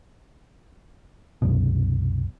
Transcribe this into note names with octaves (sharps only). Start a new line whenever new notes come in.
C2 F#2 B2